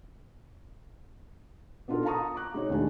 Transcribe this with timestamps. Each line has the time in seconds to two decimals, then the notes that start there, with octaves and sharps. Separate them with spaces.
1.88 B3 D4 D#4 F4 A4 A#4
2.05 F5 A5 A#5 C#6 D#6
2.35 A#5 D6 F#6
2.54 G#3 D#4 C#5
2.70 D#2 D#3 A3 D4 G#4 G#5